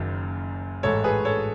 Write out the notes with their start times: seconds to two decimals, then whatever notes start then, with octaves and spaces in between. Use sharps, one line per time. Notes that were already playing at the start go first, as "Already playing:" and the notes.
Already playing: F#1 F#2 D#3
0.83 A1 G#2 E3 A4 C#5
1.04 G#4 B4
1.25 A4 C#5